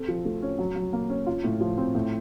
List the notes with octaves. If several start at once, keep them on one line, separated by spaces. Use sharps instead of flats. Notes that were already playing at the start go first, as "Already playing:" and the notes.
Already playing: C4 A4
F3
A3
C#4
F#3
F#3
A#3
C#4
F4
A2
F3
C4
A2